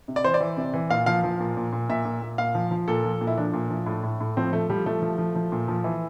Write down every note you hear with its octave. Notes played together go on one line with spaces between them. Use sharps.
C3
D5
E3 C5
D5
E3
C3
E3
A#2 F5
F3 F5
F3
A#2
A#2
A#2
A#2 E5
A#2
A#2
A#2 F5
F3
F3
A#2 A4
F3
A#2
E4
F3 D4
A#2
F3
A2
A2
A2
F3 C4
F3 A3
F3 G3
F3 A3
F3
F3
F3
A#2
F3
E3